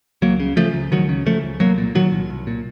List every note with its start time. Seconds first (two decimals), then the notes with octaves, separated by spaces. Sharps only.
0.22 C#2 F#3 A#3
0.40 C#3
0.56 C#3 F3 A3
0.74 C#2
0.92 C#2 D#3 F#3
1.09 C#3
1.26 C#3 F3 A3
1.43 C#2
1.60 C2 F#3 A#3
1.78 A#2
1.95 A#2 D#3 F#3
2.12 C2
2.30 C2
2.47 A#2